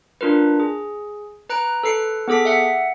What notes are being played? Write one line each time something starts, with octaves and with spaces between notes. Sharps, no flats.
D4 F4 A#4 B4
G#4
B4 A#5 F#6 D7
A4 B4 C7 C#7
B3 G#4 A4 D6 B6
E5 F#5